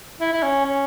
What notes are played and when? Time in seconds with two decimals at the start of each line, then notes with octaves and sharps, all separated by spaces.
0.21 E4
0.33 E4
0.43 C#4
0.65 C#4